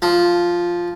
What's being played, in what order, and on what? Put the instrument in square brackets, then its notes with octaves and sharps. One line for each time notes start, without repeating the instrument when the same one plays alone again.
[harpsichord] F3